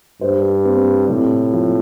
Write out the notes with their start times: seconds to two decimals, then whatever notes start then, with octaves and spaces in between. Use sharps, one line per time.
0.21 G2 C5
0.65 C4
1.09 A2 C3
1.53 F3